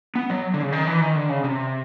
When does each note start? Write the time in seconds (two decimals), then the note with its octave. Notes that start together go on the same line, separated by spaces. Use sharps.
0.15 B3
0.30 F#3
0.54 D3
0.62 C#3
0.72 D#3
0.87 E3
1.01 D#3
1.15 D3
1.29 C#3
1.44 C3